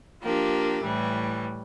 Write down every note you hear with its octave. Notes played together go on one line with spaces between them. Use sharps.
F3 A#3 D4 G4
A2 E3 G3